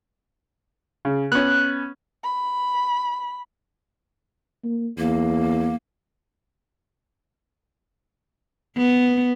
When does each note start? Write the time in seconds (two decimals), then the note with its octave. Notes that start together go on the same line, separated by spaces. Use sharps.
1.05 C#3
1.32 B3 C#4 F#6
2.24 B5
4.64 A#3
4.98 E2 A#3
8.77 B3